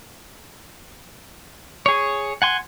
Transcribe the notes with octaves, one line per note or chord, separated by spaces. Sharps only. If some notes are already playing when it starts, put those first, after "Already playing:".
G#4 C#5
F#5 G#5 C6